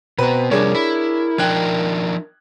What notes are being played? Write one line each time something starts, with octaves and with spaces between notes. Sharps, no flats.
B2 B3 C4 B4 A#5
C3 F3 G3 D4 G#4 A#4 C#5
E4
F3 D4 D#4 G5 F#6 G#6